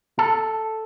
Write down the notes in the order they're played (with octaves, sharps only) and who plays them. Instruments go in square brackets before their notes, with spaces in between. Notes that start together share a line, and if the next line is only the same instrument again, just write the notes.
[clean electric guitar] A4